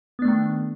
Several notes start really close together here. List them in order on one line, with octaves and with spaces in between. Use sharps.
B3 D4 A3 D#3